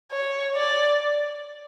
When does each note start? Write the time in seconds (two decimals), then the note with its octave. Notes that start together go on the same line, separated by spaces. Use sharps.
0.12 C#5
0.55 D5